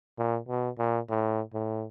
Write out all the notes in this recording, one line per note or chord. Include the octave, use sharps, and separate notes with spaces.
A#2
B2
A#2
A2
A2